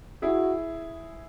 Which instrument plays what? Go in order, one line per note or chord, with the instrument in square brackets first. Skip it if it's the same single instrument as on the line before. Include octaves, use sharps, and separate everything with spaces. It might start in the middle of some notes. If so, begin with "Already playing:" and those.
[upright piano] E4 G#4 [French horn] F#4